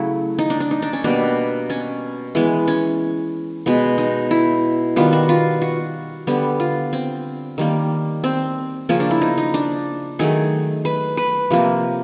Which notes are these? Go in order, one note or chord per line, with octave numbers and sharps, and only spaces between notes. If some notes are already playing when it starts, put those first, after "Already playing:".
Already playing: C#3 F#3 A3 E4
D#4
D4
D4
D#4
D4
C#4
B2 G3 A#3 D4
C#4
E3 G#3 B3
C#4
B2 G#3 B3
D#4
E4
D#3 G3 B3 F4
F#4
F4
F#4
D3 G3 B3
F4
C4
D#3 G3 A#3
C4
C#3 F3 A#3 C#4
D4
E4
D#4
D#4
D4
D#3 F#3 A3 G#4
B4
B4
C3 F3 A#3